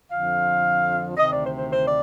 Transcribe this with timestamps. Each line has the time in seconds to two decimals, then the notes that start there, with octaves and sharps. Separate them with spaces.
0.11 F2 D3 F3 F5
1.17 D2 C3 D#3 D#5
1.30 D5
1.43 C5
1.56 C5
1.70 C5
1.88 D5